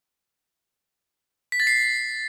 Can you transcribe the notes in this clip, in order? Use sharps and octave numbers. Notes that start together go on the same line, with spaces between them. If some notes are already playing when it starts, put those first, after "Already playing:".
B6
A6
C7